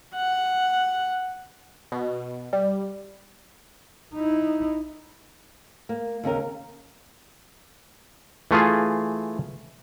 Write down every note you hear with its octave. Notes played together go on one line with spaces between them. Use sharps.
F#5
B2
G3
D#4 E4
A#3
D#2 C#3 C#4 A#4
E3 A3 F4 G#4